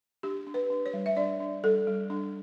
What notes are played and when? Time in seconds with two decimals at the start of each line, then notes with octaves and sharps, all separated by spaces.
0.23 D4 G4
0.47 D4
0.54 B4
0.70 D4
0.86 C#5
0.93 G3
1.06 E5
1.17 D4 D5
1.40 D4
1.64 G3 A4
1.87 G3
2.10 D4